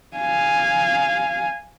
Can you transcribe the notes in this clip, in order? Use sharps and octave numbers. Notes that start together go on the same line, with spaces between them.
F5 G#5